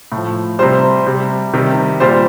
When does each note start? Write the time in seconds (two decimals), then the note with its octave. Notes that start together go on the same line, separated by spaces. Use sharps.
0.12 A2
0.17 F3
0.59 C3 G3 C5
1.07 C3 G3
1.54 C3 D#3 G3
2.00 A#2 G3 C5